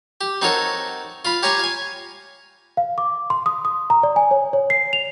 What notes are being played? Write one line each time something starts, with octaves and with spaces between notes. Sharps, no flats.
G4
C4 D#4 F#4 A4 A#4 C#5
F4 F5 B5
G4 C#5 G#5 A#5 C6 C#6
F5 G#5
F5
D6
C6
D#6
D#6
A#5
D5
G#5
C#5
C#5
C7
F7